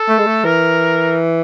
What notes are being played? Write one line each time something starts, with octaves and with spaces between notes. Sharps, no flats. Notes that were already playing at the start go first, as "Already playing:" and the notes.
Already playing: A4
A3
G#3
A3
E3 A#4